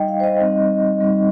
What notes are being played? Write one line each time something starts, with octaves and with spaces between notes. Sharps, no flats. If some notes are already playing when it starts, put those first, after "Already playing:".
Already playing: G3 D#4 D#5 G5
F5
C5
D#5
G3 C4 D#4
G3 C4 D#4